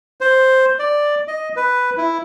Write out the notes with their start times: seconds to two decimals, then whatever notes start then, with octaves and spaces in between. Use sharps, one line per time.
0.21 C5
0.79 D5
1.28 D#5
1.56 B4
1.98 E4